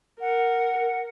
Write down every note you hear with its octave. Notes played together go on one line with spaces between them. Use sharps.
A#4 F#5